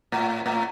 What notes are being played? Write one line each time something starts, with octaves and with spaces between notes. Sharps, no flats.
A2
A2